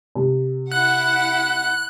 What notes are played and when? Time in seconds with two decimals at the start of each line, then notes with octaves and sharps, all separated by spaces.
0.15 C3
0.72 E4 F#5 F#6